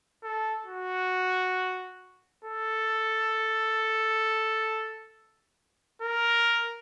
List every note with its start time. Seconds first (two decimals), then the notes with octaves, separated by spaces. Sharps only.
0.23 A4
0.67 F#4
2.45 A4
6.02 A#4